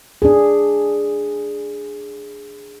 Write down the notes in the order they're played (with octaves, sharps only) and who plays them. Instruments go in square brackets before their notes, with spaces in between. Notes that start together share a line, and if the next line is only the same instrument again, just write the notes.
[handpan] D4 G#4